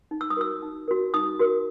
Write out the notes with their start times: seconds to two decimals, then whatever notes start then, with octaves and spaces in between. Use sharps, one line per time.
0.11 D#4
0.21 E6
0.30 D#6
0.37 F#4 A#4 E6
0.62 D#4
0.88 F#4 A#4
1.14 D#4 D#6
1.39 F#4 A#4